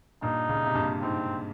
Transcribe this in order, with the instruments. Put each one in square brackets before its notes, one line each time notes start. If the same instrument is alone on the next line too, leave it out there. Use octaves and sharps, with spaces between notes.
[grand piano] G2 A#2 [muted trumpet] D#4
[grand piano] A#2 C#3
C3
G2 A#2
[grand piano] G#2 [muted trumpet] C4